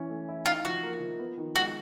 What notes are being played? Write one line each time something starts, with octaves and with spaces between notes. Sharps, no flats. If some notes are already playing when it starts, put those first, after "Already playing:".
Already playing: E3 C#4
A3
E4
D#4 F4
F3 F#4
A#3
F3
B3
D#3
G#3 F#4